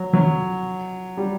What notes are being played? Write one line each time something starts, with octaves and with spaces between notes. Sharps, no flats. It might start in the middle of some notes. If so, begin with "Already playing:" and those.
Already playing: F#3
F#3
G3